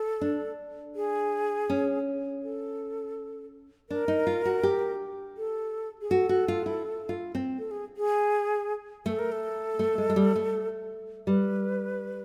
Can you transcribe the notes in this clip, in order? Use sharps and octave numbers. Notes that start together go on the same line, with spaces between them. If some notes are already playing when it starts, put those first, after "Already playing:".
Already playing: A4
D4
G#4
C#4
A4
D4 A#4
D#4
F4
F#4
G4
A4
G#4
F#4 A4
F#4
F4
E4
F4
C4
A4
G#4
G#4
A3 A4
A#4
A4
A3
G#3
G#3
G3
A3
G3 B4